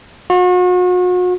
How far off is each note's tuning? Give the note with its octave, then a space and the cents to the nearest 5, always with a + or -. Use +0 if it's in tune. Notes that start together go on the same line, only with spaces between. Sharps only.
F#4 -40